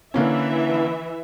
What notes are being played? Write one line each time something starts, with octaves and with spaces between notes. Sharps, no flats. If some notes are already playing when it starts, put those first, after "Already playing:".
D3 E3 A#3 C#4 E5